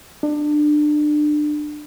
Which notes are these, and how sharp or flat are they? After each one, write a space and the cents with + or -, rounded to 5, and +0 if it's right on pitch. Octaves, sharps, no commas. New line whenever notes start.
D4 +25